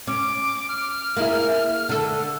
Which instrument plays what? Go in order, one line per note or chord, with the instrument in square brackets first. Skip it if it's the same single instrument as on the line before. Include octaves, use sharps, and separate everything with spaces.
[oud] C#4 [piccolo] D6
[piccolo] F6
[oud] A#3 E4 G#4
D3 A4